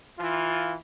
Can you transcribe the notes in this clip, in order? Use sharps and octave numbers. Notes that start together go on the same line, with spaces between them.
E3 F4